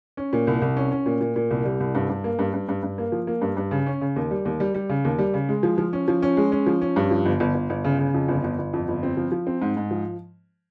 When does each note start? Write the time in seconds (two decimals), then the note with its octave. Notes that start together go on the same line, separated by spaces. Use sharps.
0.17 C#4
0.33 A#2
0.47 C2
0.62 C2
0.77 C#4
0.91 C#4
1.06 A#2
1.21 A#2
1.36 A#2
1.51 C2
1.65 G3
1.80 C2
1.95 G2
2.09 G2
2.24 A#3
2.39 G2
2.54 G2
2.69 G2
2.83 G2
2.98 A#3
3.12 F3
3.27 A#3
3.42 G2
3.57 G2
3.71 C#3
3.86 C#4
4.01 C#3
4.16 D#2
4.31 G3
4.45 D#2
4.60 G3
4.75 G3
4.90 C#3
5.05 D#2
5.18 G3
5.34 C#3
5.49 G#3
5.63 F3
5.78 F3
5.93 C#4
6.08 F3
6.23 C#4
6.37 G#3
6.52 C#4
6.66 F3
6.82 C#4
6.96 G2
7.11 F3
7.26 G1
7.40 G1
7.54 G1
7.70 G1
7.85 C#3
7.99 C#3
8.14 F2
8.28 G1
8.44 G1
8.58 G1
8.73 F2
8.88 G1
9.03 C4
9.17 F3
9.32 F3
9.47 C4
9.62 G#2
9.77 G#2
9.91 F3